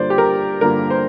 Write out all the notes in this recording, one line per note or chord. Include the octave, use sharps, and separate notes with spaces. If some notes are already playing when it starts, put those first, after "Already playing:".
Already playing: G2 D3 A#3 F4 C5 D5
G4
A#4
G2 D3 A#3 F4 A#4
C5